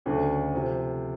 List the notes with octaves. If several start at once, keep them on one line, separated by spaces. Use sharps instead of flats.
D2 C#3 F#3 A3 D4
C3 F3